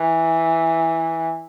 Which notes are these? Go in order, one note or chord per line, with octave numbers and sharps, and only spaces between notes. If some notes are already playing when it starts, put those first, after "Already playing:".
Already playing: E3